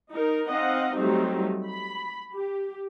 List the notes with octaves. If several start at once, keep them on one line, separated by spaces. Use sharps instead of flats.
D#4 A#4
C4 D#4 D#5 F5 F#5
F#3 G3 A3 C4 D#4
B5
G4